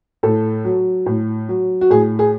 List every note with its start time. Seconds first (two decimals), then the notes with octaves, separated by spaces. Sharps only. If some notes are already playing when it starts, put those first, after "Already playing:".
0.23 A2 A4
0.65 F#3
1.06 A2
1.49 F#3
1.81 F#4
1.90 A2 G#4
2.19 G#4